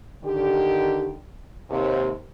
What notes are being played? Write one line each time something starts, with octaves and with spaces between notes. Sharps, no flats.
D3 D#3 G4
D#2 C3